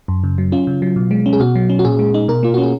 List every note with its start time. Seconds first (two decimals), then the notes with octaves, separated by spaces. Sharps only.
0.08 F#2
0.24 C#3
0.38 F#3
0.52 C#4 F4
0.67 C#3
0.82 F#3
0.96 B2
1.11 G#3
1.26 C#4
1.33 G#4
1.40 B2 F#4
1.55 F#3
1.69 C#4
1.79 F#4
1.85 A#2 G#4
1.99 G#3
2.14 D#4
2.28 B2 A#4
2.43 A#3 F4
2.54 C#4 F#4
2.63 G#4